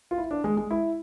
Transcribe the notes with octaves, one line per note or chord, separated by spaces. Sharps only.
F4
E4
D4
G#3
G#3
E4